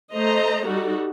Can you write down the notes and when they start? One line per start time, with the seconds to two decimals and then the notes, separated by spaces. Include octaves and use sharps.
0.14 A3 C5 D#5 A#5
0.67 G3 D#4 F#4 A4